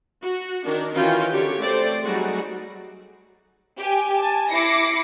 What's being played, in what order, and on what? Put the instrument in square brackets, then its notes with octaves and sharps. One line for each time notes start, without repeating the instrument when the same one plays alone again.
[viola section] F#4
D#3 D4 A#4
D#3 E3 C#4 F4 F#4 G5
D3 G4 C#5
A3 C4 C5 D5
F#3 G3 A3 D#4 F#4 G#4
[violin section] G4 G5 G#5
G#5 A5
E4 D6 A#6 C7 C#7